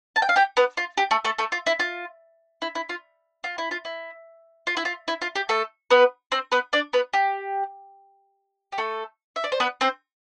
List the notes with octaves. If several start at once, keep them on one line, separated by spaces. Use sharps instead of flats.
A5
G5
F5
G4 G5
B3 B4
F4
G4
A3 A4
A3 A4
A3 A4
F4
E4
F4
E4
E4
F4
F4
E4
F4
E4
F4
E4
F4
E4
F4
G4
A3 A4
B3 B4
C4 C5
B3 B4
D4 D5
B3 B4
G4
G4
A3 A4
E5
D5
C5
B3 B4
C4 C5